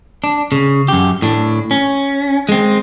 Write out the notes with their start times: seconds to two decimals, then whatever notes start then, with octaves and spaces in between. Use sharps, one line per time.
0.24 D4
0.52 C#3
0.88 F#2 G4
1.22 A2 D4
1.71 C#4
2.49 G#3 C4